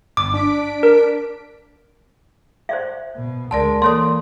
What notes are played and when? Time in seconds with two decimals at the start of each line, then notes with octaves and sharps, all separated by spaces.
0.17 G1 D6
0.34 D4 B6 D7
0.83 A#4
2.69 C5 D5 E5
3.16 B2
3.51 D2 G#3 A#4 D5 A5 C6
3.82 E3 A#3 A4 C#5 D5 C6 D#6